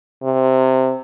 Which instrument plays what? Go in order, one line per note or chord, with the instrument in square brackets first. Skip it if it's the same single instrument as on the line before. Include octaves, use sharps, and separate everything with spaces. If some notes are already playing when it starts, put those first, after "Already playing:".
[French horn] C3